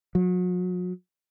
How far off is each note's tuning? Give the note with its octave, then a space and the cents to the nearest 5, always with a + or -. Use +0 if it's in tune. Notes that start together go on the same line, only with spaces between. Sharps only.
F#3 -40